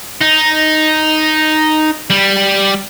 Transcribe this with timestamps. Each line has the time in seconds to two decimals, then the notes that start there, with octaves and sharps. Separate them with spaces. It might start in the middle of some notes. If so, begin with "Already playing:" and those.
0.21 D#4
2.10 G3